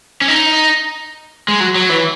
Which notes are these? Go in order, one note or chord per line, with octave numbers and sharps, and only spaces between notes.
C#4
D#4
G#3
F#3
F#3
E3